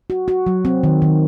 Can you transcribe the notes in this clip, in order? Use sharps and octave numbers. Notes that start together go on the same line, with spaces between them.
F#4
F#4
F#3
C4
D#3
D#3